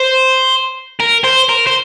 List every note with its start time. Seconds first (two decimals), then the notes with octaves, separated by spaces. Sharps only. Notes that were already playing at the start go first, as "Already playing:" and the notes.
Already playing: C5
1.00 A#4
1.24 C5
1.49 A#4
1.67 C5